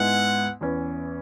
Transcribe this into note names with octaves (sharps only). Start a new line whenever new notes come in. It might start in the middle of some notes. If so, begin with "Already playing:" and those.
Already playing: G#2 G#3 B3 E4 F#5
E2 E3 C#4